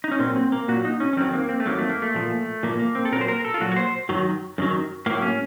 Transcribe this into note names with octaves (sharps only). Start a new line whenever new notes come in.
D#4
C#4
A#2 F#3 C4
C4
A#3
A#2 F#3 F#4
D#4
C#4
C#4
F2 D#3 F#3 C4
A#3
C4
A3
F2 D#3 F#3 A#3
A3
A#3
A3
A#2 F3
A#2 F3 A#3
A#3
C4
A4
A#2 F#3 A#4
C5
A#4
A4
F4
A#2 F#3 F#4
C#5
C5
F#2 D#3 F#3
F#2 D#3 F#3
A2 F#3 A#3
C#4